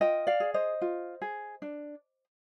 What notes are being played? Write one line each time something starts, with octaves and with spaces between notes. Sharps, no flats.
F4 D#5 G5
D5 F5
G#4
C5 D#5
F4
G#4
D4